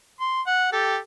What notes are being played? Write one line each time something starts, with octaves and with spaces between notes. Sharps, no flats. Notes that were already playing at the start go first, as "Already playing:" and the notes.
C6
F#5
G4 A4